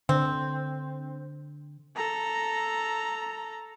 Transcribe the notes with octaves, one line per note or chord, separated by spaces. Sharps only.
D3 C4
A4 A#5